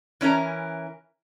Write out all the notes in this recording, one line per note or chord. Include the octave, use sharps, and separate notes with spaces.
E3 C#4 E4 A#4